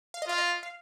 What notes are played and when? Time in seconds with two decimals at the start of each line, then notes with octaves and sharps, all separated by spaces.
0.14 F5
0.22 D#5
0.27 F4 F5
0.38 D#5
0.63 F5